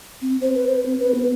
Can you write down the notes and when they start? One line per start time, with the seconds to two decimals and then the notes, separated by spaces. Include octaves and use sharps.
0.22 C4
0.41 C5
0.55 B4
0.67 C5
0.86 C4
1.00 B4
1.15 B3